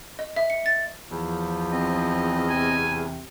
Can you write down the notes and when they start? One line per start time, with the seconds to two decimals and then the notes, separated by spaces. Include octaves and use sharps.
0.19 D#5
0.36 E5
0.50 C#7
0.66 A6
1.11 E2 F3
1.72 C4 D#5
2.50 C3 G#5